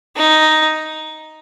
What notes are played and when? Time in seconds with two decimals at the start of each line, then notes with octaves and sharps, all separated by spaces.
0.17 D#4